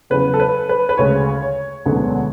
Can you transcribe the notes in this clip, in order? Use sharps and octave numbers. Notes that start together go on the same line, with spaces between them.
E2 C#3 F#3 B4
A4
B4
B4
B4
D2 C#3 G#3 C#4 C#5
C#5
E1 D2 D3 F#3 B3